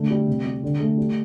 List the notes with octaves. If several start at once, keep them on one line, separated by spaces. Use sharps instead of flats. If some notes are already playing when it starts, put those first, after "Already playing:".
Already playing: D3 A3
G3
C3
G3
D3
A3
G3